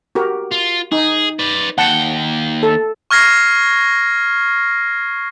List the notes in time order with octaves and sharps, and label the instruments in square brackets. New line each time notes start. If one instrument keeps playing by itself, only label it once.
[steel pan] F#4 G4 A#4
[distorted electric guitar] F4
[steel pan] D#4 [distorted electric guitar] G#4
[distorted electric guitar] B4 D5
[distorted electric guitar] D#2 G5 [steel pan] F#5 A5
[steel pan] A4
[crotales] C#6 F6 G#6 A#6 C7